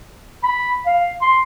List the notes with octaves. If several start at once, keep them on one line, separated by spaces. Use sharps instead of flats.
B5
F5
C6